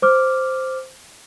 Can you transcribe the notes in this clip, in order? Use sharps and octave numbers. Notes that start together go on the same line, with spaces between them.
C5 D6 F6